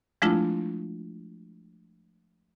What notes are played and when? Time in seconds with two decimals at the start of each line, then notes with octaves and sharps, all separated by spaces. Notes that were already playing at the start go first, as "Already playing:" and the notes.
0.22 F3 G#3 A3 D4 E4 F4